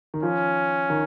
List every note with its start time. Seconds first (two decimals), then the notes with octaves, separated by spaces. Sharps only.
0.14 D#3
0.23 F3 C#4
0.90 D#3